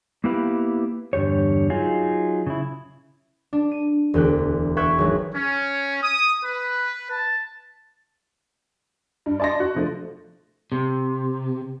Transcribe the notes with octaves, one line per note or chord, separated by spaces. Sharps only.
A#3 B3 E4 G4 B4 F5
E2 G2 D3 G4 C#5
F#3 D#4 F4 G#4
C#3 E4
D4
D#7
E1 D2 G5 F#6
B4 E5 G5 C#6 F#6 G#6
G#1 F#3
C#4
D#6
B4
A5
G2
D5 D#5 A5 C6 A#6
F#4
D3 F3 A3
C3